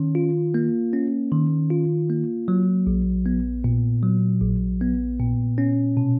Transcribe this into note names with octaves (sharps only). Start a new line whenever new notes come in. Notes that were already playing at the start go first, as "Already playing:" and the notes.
Already playing: D#3 C#4
F4
A#3
C#4
D#3
F4
A#3
F#3
A#1
B3
A#2
F#3
A#1
B3
A#2
C#4
B2